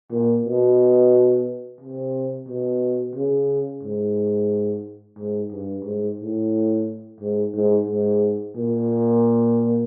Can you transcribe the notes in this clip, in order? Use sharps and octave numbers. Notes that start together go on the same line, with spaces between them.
A#2
B2
C3
B2
C#3
G#2
G#2
G2
G#2
A2
G#2
G#2
G#2
A#2